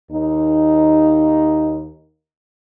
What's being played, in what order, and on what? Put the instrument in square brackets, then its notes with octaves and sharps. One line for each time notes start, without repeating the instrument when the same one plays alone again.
[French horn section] D#2 D#4